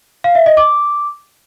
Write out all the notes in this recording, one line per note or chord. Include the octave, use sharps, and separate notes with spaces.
F5
E5
D#5
D6